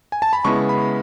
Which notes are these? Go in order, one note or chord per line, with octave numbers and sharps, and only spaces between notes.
G#5
A5
B5
C#3 G#3 B3 E4 C#6
B5